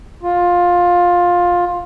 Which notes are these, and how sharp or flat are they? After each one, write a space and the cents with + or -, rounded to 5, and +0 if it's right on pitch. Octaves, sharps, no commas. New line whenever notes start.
F4 +15